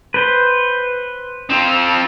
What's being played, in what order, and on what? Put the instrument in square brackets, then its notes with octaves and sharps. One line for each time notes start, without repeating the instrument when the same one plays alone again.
[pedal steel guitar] B4 C5
[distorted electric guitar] F3 C4